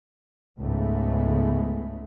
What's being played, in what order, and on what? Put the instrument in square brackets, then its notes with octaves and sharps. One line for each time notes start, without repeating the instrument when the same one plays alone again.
[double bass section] C#2 G#2 C#3 G#3 A3 B3